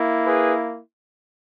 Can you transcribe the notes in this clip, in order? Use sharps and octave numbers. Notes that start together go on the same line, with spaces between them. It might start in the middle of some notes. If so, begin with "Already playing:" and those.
Already playing: A#3 E4
G#4 B4